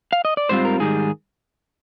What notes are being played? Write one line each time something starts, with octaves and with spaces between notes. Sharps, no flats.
F5
D#5
D5
G#2 G3 C4 F4 C5
A#4
G#2 D#3 G3 G#4